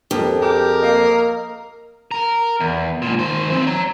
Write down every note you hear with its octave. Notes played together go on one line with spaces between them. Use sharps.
F2 G4 A#4
G4 G#4 A#4
A#3 D#5
A#4
E2
C#2 A#2
D#3 C5
E3 C4
C#5 A#5